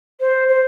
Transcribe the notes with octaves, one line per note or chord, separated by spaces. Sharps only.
C5
C5